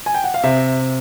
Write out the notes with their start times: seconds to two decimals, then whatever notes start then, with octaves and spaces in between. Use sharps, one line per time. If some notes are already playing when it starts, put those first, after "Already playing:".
0.06 G#5
0.14 G5
0.24 F#5
0.34 F5
0.43 C3 E5